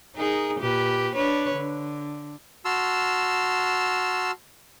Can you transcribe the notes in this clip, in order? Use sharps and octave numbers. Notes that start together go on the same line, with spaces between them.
D#4 G#4 A#4
A#2 G4 B4
D4 B4 C#5
D3
F#4 A5 C6 E6 F6